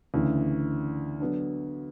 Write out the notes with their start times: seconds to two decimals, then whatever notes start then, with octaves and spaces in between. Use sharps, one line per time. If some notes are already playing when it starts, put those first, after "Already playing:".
0.14 D2 C#3 E3
1.20 D3 F#3 B3 D4